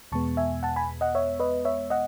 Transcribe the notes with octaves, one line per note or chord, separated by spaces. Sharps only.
E2 B2 G#3 B3 A5 C#6
E5 G#5
F#5 A5
G#5 B5
D#5 F#5
C#5 E5
B4 D#5
C#5 E5
D#5 F#5